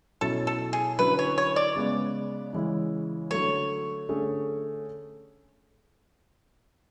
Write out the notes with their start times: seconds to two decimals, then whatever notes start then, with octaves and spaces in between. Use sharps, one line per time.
0.21 B2 F#3 C#4 E4 A4
0.47 A4
0.73 G#4
0.99 D3 F#3 C#4 E4 B4
1.19 C#5
1.38 C#5
1.56 D5
1.76 C#3 G#3 B3
2.53 C#3 E3 G#3 C#4 E4
3.31 D3 F#3 A3 C#5
4.09 D3 A3 C#4 G#4